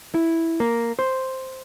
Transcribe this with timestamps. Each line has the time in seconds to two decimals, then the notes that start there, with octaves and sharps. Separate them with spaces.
0.14 E4
0.60 A#3
0.99 C5